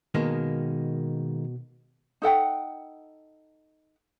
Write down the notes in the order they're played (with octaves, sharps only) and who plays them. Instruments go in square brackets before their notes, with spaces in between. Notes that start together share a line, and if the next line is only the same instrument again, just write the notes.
[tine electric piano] B2 [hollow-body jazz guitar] D#3 G#3 A#3
[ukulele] D#4 A4 F#5 G5